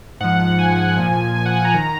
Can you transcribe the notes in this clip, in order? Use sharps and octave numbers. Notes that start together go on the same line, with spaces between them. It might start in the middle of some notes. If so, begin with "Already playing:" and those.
G#2 F3 F#5
G#5
A#2 F3
G#5
F#5
G#5
A#5
D#3